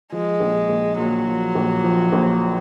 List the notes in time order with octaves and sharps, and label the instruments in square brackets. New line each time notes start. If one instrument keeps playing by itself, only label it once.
[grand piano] F3 [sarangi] G#3
[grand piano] A#1
A#1
[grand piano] A#2 [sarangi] F#3
[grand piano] F3
A#1
F3
A#1